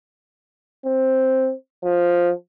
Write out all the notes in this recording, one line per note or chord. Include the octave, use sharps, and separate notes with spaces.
C4
F3